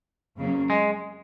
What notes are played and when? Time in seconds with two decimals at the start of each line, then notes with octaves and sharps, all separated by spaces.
0.37 F2 C#3 F#3 A#3 C#4
0.70 G#3